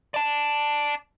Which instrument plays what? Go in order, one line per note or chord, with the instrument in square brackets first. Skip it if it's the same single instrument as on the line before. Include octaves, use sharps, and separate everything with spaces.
[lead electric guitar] D5 A5